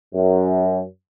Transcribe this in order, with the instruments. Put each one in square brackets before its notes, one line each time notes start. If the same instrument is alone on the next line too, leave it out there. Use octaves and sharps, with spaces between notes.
[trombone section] F#2